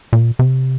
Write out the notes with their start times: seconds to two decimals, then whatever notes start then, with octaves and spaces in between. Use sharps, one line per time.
0.13 A#2
0.39 C3